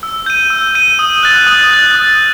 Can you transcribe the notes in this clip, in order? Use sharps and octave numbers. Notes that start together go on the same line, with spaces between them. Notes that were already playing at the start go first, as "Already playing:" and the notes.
E6
G6 D#7
E6
G6 D#7
D#6
F#6 A6
D#6
F#6 A6
D#6